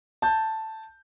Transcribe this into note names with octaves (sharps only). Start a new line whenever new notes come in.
A5 G6